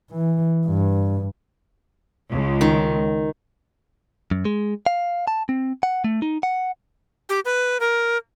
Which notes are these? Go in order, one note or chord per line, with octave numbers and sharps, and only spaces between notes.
E3
G2
C#2
D#3
F#2
G#3
F5
A5
C4
F#5
A3
D#4
F#5
G4
B4
A#4